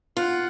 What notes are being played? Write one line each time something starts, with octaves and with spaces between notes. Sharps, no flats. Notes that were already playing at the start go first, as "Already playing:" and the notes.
F4 F#5